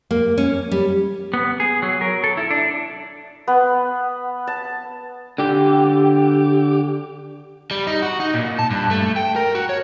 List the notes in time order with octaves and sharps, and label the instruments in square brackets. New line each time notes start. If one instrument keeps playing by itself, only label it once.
[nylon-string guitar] A#3
C#4
G3
[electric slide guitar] B3
G#4
F#3
A#4
A4
E4
D4
[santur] B3
A5
[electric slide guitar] D3 G4
[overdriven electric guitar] G3
D#4
F#4
D#4
A#2
A5
G2
A3
G5
A#4
F#4
C#5